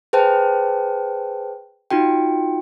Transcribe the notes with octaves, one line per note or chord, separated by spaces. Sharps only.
G#4 B4 C5 G5 A5
D#4 F4 F#4 G5